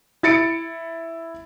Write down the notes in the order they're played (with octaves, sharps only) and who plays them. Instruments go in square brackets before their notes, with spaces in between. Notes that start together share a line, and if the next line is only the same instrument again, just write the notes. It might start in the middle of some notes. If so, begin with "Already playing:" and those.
[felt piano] E4 A6 C#7 D7